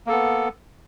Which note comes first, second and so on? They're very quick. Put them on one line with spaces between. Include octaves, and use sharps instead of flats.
A#3 A4 B3